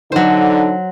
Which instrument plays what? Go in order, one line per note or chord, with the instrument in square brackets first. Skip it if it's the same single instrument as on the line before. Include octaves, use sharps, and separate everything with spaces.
[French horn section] D3 D#4 [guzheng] F#3 C5